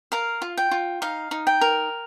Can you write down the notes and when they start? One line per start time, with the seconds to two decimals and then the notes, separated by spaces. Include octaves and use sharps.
0.12 A#4 F5
0.42 F4
0.57 G5
0.71 F4
1.02 D#4 F5
1.31 D#4
1.47 G5
1.61 A#4